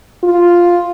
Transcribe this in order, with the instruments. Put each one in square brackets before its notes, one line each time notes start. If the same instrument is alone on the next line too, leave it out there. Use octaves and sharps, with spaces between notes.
[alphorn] F4